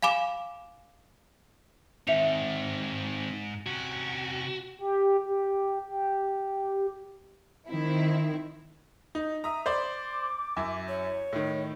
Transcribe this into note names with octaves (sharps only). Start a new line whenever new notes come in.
F5 G#5 B5 D6 E7
G#2 D#3 C4 E5 C#7 F7
C3 C#4 F#4
G4
G4
G4
D#3 C4 E4
D#4
E5 A#5 D#6
C5 D5 B5 D6
F#2 E4
C#5
A2 D#3